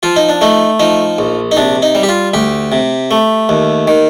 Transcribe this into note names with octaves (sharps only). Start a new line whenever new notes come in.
F3 F4
D#4
D4
A3 D#4
F3 D#4
A#1
D#4
C3 D4
D#4
G3
G4
F4
D2 G4
C3
A3
D#2
D#3